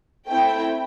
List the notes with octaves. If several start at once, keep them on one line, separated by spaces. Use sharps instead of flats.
A3 C4 E4 G5